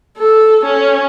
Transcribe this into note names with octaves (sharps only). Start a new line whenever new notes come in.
A4
C#4